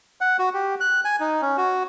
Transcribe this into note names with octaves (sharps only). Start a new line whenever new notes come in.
F#5
F#4
G4
F#6
G#5
D#4
C#4
F#4